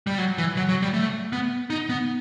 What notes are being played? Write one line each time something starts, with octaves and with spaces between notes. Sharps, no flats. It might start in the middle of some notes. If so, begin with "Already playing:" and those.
G3
F#3
E3
F#3
F#3
G3
A3
B3
D#4
B3